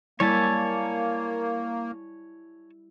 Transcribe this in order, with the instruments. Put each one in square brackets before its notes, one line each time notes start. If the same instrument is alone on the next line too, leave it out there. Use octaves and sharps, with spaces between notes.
[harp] G3 E4 E6 [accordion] A#3 [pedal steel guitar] C#5 G#5 A5